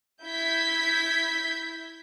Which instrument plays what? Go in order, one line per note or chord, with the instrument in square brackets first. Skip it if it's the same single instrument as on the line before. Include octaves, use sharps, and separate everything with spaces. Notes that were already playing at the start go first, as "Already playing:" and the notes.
[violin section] E4 G6 G#6 B6